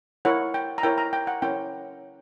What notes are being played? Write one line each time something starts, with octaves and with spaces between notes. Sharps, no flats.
E4 A#4 C#5 F#5
G5
A#5
E4 A#4 C#5 G5
A#5
G5
F#5
C#4 E4 A#4 G5